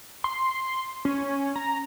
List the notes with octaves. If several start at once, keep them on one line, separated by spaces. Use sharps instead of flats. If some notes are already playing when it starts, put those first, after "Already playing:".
C6
C#4
A#5